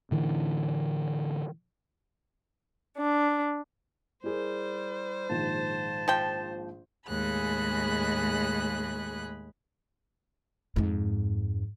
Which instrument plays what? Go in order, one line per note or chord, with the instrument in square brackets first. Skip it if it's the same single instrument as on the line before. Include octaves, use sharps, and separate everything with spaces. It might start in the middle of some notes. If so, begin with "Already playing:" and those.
[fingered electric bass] A2 D3 E3
[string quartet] D4
[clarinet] G3 [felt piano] E4 G#4 A#4 [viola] C5
[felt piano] A#1 G#2 D#3 [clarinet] A5
[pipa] F3 G5
[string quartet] D#2 A2 G#3 G#4 B5 F#6
[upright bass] F2 G#2